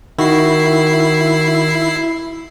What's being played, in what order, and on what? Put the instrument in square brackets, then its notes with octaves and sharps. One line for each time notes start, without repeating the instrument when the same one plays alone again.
[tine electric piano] D#3 F#4 [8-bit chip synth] E4 C7